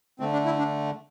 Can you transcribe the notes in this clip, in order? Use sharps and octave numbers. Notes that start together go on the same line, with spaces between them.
D3 A3 C4
D4
E4
D4